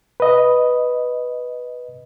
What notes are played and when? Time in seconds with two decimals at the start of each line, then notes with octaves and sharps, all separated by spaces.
0.20 B4 D#5